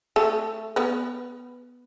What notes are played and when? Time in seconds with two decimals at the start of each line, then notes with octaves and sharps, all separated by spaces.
0.16 A3 A4
0.76 B3 B4